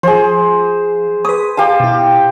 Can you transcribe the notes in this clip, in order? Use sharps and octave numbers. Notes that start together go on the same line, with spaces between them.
F3 G#4 C5
G#4 B4 D#6
G4 F5 A5
B2 E4